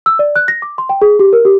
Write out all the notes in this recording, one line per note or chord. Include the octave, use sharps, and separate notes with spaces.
E6
D5
F#6
A#6
D6
C6
G5
G#4
G4
A#4
G4